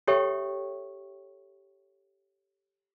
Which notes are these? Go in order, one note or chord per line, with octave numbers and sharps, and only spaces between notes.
G4 A4 C#5 E5 G5 C#6